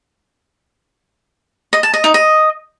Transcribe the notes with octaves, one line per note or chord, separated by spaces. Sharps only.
D#5
A5
D#5
D#4
D#5